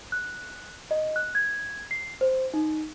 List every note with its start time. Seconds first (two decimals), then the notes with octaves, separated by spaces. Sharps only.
0.12 F#6
0.91 D#5
1.16 F#6
1.35 G#6
1.91 C7
2.21 C5
2.54 D#4